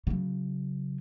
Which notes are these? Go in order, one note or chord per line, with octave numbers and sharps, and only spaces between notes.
C#3 F#3